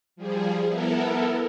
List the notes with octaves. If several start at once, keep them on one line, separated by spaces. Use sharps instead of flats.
F3 G3 G#4
B3 E4 A4 A#4